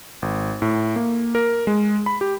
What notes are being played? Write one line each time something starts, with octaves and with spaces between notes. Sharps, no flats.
G#1
A2
A#3
A#4
G#3
B5
G4